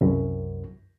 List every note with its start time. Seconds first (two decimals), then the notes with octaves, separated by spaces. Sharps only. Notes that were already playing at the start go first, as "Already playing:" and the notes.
0.01 C2 F#2